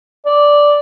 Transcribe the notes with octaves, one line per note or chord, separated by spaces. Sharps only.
D5